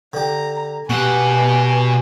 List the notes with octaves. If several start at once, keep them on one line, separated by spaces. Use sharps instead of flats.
D3 G4 A#5
B2 F#4 G4 B4 F#5 G#5